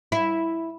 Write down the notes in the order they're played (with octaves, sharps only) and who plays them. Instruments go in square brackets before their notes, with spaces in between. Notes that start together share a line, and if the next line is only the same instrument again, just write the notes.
[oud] E4